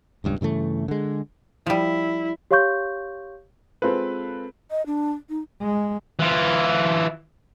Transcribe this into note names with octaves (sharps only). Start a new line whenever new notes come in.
D#1 C#2 G2
G2 C#3 E3 A3
D3 G#3
F3 G3 E4
G4 C#5 F5 C6 C#6 G6
G#3 C4 F4 A4 B4
D#5
D4
D#4
G#3
E3 F4